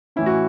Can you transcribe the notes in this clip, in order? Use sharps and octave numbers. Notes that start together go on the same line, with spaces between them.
A2 E3 C#4 E4
F#4